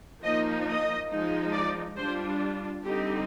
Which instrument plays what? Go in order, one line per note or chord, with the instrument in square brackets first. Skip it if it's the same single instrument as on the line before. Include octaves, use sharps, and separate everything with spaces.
[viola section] F3 A#3 D#4 D#5
D#5
F3 G#3 D#4
D5
G3 D4 F4 C5
D3 G3 C4 D#4 G4